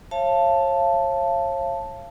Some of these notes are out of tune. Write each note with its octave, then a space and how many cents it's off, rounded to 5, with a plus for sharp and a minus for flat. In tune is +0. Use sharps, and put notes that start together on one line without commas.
C#5 -40 F5 -30 A5 +0